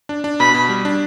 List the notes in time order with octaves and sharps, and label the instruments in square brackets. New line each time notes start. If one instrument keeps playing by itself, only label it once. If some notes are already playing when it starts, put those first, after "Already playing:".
[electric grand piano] D4
D4
[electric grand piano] B2 [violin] B5
[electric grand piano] B2
G3
D4